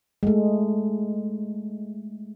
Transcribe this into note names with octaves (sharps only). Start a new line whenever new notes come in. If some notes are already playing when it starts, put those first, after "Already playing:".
G#3 A3